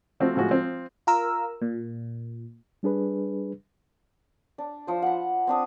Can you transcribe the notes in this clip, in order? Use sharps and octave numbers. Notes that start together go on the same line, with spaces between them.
F3 A3 C4 F#4
A2 F3 G#3 F#4
F3 C4
F4 A#4 E6
A#2
G3 D4 G#4 B4
D4
F3 C5
F#5 B5
C4 D4 D#6